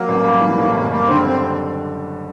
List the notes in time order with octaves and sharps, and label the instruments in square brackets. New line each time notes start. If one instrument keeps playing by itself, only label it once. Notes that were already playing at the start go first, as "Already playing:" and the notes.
Already playing: [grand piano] F#3 [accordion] A#3
[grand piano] A1
G3
E3
A2
[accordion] A3
[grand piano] F#1 [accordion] A#3
[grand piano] G3 [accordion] A#3
[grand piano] D3 [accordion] C4
[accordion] C4